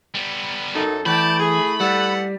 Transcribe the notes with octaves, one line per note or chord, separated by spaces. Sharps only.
G3 B3
F#2 D#4 A4
E3 A3 E4 D5 G5 A5 B5
G#4
G3 A4 B4 F#5